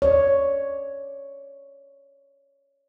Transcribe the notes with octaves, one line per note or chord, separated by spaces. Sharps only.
C#5 D5